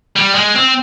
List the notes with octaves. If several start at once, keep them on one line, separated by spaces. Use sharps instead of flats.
G3
G#3
C4